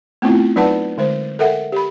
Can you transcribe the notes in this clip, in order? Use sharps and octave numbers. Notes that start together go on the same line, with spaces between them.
A3 B3 C4 E4 F4
F#3 D#4 B4 D5 F#5 A5
D3 G#3 C5
A4 A#4 E5 F#5 G5
G4 B5